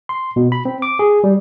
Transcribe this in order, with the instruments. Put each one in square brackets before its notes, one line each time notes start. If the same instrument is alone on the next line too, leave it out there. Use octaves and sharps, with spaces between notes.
[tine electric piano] C6
B2
B5
C4
D6
G#4
G3